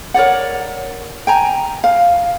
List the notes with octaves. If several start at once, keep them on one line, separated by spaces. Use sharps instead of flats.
A#4 C#5 D5 F#5
G5 G#5 A#5
F5